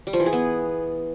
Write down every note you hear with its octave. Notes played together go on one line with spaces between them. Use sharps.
G3
F3
E3
G#4
B3